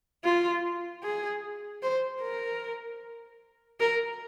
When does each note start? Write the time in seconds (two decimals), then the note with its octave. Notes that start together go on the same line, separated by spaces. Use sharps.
0.24 F4
1.03 G#4
1.82 C5
2.22 A#4
3.80 A#4